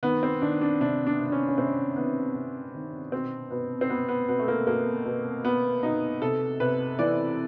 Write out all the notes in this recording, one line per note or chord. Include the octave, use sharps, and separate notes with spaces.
D#3 B3
C4
D#3 D4
D4
C3 D4
D4
C3
D4
C#4
C#4
C3 C4
D#3 B3
C3
D#3
B2 C4
B2 B3
C4
B2 B3
B3
B2 B3
A3
A#3
B2 A#3
B2
B2 B3
B2 D#4
C3 A4
C3 B4
E3 D5